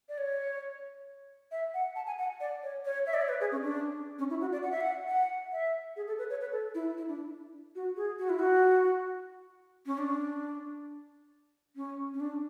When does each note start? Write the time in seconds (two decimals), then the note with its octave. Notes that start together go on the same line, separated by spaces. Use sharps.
0.09 D5
0.18 C#5
1.51 E5
1.74 F#5
1.96 A5
2.07 G#5
2.19 F#5
2.40 D5
2.63 C#5
2.85 C#5
3.06 E5
3.14 D5
3.22 C#5
3.29 B4
3.41 G#4
3.52 C#4
3.63 D4
4.19 C#4
4.30 E4
4.41 F#4
4.52 D5
4.63 F#5
4.71 E5
4.81 F#5
5.08 F#5
5.52 E5
5.96 G#4
6.07 A4
6.18 B4
6.30 C#5
6.41 B4
6.52 A4
6.75 E4
6.97 E4
7.08 D4
7.75 F#4
7.97 G#4
8.19 F#4
8.30 E4
8.39 F#4
9.86 C#4
9.98 D4
11.76 C#4
12.14 C#4
12.20 D4